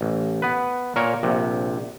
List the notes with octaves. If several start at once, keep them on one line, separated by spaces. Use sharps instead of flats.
A1
B3 B4
A#2 A#4 C#5
A#1 C3